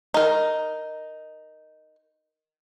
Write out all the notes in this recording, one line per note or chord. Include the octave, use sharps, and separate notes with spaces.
D#4 A#4